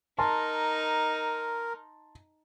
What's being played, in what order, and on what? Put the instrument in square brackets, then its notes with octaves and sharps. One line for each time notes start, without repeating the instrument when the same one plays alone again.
[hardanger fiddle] D#4 [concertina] A#4 [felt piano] A5 C6